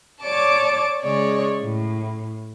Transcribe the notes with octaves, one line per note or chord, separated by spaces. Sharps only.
C#5 D5 A5 D6
C#3 G#3 C#5 D5
A2